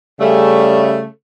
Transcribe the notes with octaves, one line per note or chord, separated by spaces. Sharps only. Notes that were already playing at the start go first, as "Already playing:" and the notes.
C#3 G3 A3